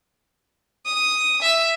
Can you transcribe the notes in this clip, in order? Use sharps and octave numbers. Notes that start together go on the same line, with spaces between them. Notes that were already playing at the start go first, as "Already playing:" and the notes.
D#6
E5